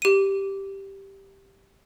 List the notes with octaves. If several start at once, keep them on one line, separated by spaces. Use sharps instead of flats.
G4 D#7